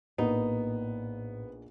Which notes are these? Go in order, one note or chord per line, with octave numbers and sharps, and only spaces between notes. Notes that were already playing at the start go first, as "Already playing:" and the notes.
A#1 A2 A#3 B3 D#4